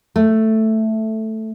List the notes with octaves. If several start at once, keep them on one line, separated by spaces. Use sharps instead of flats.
A3